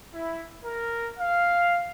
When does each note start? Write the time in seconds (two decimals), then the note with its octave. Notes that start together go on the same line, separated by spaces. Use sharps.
0.14 E4
0.64 A#4
1.17 F5